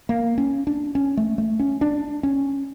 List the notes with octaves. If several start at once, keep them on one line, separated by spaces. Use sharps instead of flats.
A#3
C#4
D4
C#4
A3
A3
C#4
D4
C#4